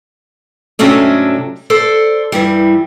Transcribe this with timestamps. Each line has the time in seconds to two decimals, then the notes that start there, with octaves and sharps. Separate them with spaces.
0.79 G#2 C3 F#3 A3 C#4 D4
1.70 A4 C5 D5
2.32 G2 E3 G3